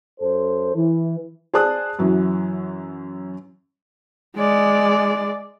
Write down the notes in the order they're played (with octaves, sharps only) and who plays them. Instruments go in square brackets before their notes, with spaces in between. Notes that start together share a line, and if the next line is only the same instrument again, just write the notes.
[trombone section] F#2 A4 C5
E3
[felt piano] G#4 C5 D5 A5 D#6 F#6
F#2 E3 F#3
[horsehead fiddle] G#3 D5